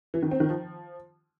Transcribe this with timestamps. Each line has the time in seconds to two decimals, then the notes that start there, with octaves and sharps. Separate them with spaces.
0.14 E3
0.23 D#3
0.31 C4
0.40 D#3
0.49 F3